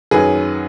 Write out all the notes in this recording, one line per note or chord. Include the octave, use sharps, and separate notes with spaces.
F#2 D#3 F#3 G#4 B4